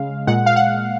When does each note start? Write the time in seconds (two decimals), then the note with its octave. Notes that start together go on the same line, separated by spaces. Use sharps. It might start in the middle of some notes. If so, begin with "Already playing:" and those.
Already playing: C#3 G#3 F5
0.27 A#2 G#3 F#5
0.46 F5
0.56 F#5